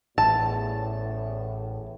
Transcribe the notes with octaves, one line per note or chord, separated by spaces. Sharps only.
A1 E2 A2 A5